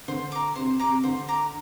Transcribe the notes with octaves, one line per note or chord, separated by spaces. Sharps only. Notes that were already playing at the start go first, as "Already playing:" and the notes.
D3 C5
A#5 D6
C3 C5
C3 A#5 D6
D3 C5
A#5 D6